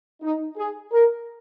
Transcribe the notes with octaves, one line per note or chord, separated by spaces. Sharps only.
D#4
G#4
A#4